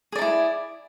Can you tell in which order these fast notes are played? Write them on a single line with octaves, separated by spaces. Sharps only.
G#4 D5 D#4 E4